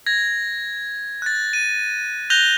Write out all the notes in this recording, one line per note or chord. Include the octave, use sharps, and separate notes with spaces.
G#6 A#6
F#6 A6
D#7
F#6 G6 A#6 F7 G7